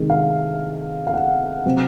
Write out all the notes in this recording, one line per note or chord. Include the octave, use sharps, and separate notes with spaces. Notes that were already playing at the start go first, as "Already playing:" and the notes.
Already playing: C3 D#3 G#3
F5
F5
F#5
C3 F#3 C4